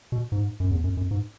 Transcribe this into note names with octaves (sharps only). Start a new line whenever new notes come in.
B2
G#2
F#2
E2
F#2
F#2
G#2